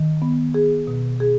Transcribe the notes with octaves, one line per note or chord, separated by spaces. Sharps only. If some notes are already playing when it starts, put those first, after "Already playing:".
Already playing: D#3
B3
G#4
B2
G#4